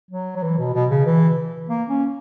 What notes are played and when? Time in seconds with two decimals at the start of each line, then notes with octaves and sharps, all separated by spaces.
0.11 F#3
0.36 F#3
0.43 E3
0.58 B2
0.74 B2
0.90 C#3
1.06 E3
1.69 A#3
1.89 C#4